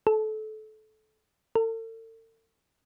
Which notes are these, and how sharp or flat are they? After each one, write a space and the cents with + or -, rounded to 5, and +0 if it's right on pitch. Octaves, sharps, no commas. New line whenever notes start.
A4 -25
A4 +40